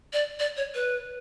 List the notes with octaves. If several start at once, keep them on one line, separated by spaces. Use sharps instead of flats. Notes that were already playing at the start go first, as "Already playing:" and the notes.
D5
D5
C#5
B4